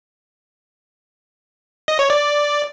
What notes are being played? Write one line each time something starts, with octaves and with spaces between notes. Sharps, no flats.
D#5
C#5
D5